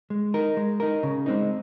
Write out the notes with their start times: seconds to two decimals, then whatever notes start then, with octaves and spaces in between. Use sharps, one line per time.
0.10 G#3
0.34 D#4 A#4
0.57 G#3
0.80 D#4 A#4
1.03 C#3
1.26 G#3 C4 D#4